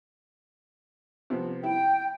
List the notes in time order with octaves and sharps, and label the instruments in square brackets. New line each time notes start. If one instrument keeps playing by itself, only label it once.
[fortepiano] C3 F3 B3
[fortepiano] E4 [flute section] G5